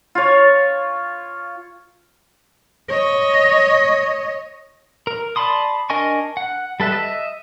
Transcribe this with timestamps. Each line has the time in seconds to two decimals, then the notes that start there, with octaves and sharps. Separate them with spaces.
0.15 F4 C#5
2.89 C#5 D#5
5.07 A#4
5.36 D5 A5 B5 C6 D#6
5.90 D4 A#4 D#5 G#5 C#6
6.37 F#5
6.80 G3 A4 B4 E5
6.92 D#5 E5